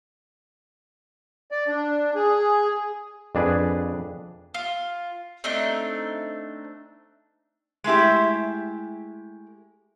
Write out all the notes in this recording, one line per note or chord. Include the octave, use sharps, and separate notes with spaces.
D5
D4
G#4
F2 D4 G#4 B4
F4
A3 C4 D4 D#4
G#3 A3 E4 G4